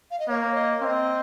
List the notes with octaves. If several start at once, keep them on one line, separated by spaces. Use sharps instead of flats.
F5
D#5
A#3 C#5
D#5
C4 D#5 F5